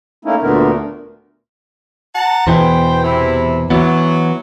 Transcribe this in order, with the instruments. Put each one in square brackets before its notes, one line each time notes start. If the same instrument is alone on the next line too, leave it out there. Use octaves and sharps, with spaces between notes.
[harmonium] A3 A#3 C#4 D#4 E4
D2 A#2 D3 A3 B3 A#4
[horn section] F#5 A5 A#5
[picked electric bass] E2 B2 E3 [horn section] B3 C5 G5
[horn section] C3 E4
[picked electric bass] E3 B3 [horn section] F#3